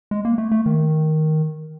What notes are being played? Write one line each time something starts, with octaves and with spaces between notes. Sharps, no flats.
G#3
A#3
A3
A3
D#3